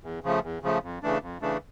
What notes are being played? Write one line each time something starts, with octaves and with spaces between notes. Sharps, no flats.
E2
C#3 F3 A3
E2
C#3 F3 A3
F2
C#3 E3 A3 D4
F2
C#3 E3 A3 D4